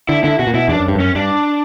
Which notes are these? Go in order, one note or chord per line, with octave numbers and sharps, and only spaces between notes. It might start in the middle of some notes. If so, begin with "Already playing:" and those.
D3 E4
D3 E4
B2 F#4
A#2
B2 E4
E2 D4
F#2
G2
F#2 C#4
G2 D4